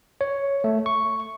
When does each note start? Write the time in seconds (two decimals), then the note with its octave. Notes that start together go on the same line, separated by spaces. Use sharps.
0.21 C#5
0.64 A3
0.86 C#6